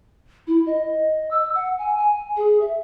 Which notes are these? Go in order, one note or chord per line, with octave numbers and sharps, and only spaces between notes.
E4
D#5
E6
F#5
G#5
G#5
G#4
E5